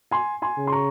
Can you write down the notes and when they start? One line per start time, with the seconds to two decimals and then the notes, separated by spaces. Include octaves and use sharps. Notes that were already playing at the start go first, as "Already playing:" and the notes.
0.11 G#5 C6
0.42 G#5 C6
0.58 C#3
0.67 C6
0.72 A#5 C#6